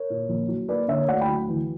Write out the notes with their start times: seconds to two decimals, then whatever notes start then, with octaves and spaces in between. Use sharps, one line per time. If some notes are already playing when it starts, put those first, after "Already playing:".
Already playing: A#4 C#5
0.10 A#2
0.29 A#1
0.48 F#3
0.68 A#3 B4 D5
0.88 D3 C#5 E5
1.08 D2 D5 F#5
1.21 G5 B5
1.28 F#3
1.48 E3